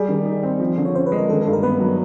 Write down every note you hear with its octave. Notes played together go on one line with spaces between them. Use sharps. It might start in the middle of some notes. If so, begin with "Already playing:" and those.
Already playing: G3 G#4
D#3
D#4
C4
F3
D3
C#5
C#4 C5
B4
G#3
A#4
D#3 A4
G2 A4
A#4
B3 B4
F#3